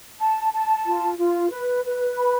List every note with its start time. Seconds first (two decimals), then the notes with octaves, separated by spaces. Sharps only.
0.20 A5
0.53 A5
0.86 F4
1.18 F4
1.51 B4
1.85 B4
2.17 B5